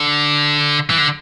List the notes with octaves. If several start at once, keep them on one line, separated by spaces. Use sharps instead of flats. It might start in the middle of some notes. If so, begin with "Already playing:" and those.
Already playing: D3
E3
D3